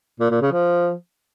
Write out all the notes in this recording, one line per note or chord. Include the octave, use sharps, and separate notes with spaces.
A#2
A#2
C#3
F3